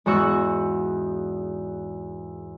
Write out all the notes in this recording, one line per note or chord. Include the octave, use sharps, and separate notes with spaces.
E2 G#2 F#4 C#6 E6 F#6